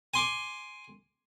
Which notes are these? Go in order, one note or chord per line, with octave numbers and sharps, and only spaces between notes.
G#5 C6 D6